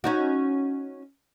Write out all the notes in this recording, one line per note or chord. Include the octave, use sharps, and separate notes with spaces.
C#4 D#4 F#4